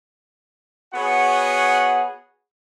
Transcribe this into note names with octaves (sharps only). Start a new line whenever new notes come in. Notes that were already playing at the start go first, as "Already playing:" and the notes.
B3 F#4 G#4 C#5 F#5